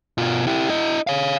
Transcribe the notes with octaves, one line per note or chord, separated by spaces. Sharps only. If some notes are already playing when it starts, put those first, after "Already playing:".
B2 F4
E4 G4
E4 D#5
C#5 F5